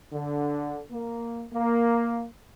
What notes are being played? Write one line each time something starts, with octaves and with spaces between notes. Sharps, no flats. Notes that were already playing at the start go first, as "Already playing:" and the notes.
D3
A#3
A#3